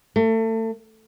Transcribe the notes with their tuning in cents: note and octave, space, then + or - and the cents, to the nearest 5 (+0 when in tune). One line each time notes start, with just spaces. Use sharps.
A3 +30